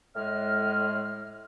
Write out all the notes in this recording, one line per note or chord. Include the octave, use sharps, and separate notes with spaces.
A2 G#3 F6